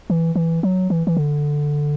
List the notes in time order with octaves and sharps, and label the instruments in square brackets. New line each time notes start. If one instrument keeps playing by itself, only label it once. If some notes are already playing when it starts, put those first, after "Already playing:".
[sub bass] E3
E3
F#3
E3
E3
D3